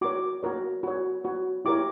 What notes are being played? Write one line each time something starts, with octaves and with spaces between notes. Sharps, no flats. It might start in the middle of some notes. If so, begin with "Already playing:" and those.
F#4 A#4 C#5 D6
F#4 A#4 C#5
F#4 C#5
F#4 C#5
E4 G4 A#4 C#5 D6